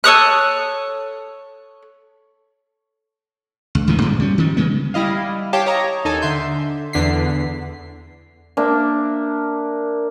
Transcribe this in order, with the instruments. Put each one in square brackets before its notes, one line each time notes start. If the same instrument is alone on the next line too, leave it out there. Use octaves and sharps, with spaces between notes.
[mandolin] A4 C#5 D#6 F#6
[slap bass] C#2
D2 G#2 D#3 E3
G2 A#2 F3 G#3
G3 C#4
D#3 F3 G3
C#3 G#3 B3
[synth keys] G3 E4 D#5 F5
G4 C#5 F5 G5 A5 D6
C#5 D#5 A#5
D#2 D#4 A4 G#5
D3 E5 C6 G6
E2 D3 B6 C7
[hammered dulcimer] A#3 D4 E5